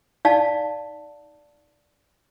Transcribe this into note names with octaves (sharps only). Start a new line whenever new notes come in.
D#4 D5 F5 A5